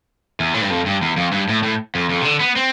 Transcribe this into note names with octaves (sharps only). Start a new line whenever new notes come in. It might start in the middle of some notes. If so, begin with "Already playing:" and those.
E2
A2
G2
F2
G2
E2
F2
G2
A2
A2
F2
F2
C3
D3
B3
C4